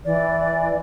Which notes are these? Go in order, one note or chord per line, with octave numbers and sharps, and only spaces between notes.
E3 D5